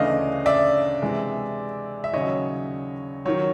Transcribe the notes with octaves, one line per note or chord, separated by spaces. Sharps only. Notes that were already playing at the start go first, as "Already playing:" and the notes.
Already playing: D2 C#3 E3 A3 D4 D#5 F5
D5 E5
C3 E3 G#3
E5
D#2 C#3 F#3 C#5 D#5
D#3 F#3 C#5